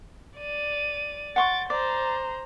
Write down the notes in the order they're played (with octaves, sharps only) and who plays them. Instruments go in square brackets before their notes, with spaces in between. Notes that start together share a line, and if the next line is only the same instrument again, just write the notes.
[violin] D5 D#7
[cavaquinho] F#5 C6 C#6 [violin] A6 D7
[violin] C5 A#5 [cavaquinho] D5